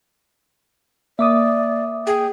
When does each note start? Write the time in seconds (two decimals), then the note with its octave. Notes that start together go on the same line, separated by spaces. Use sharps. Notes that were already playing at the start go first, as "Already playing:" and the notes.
1.19 A#3 D5 E5 D6 D#6
2.07 G#4 G5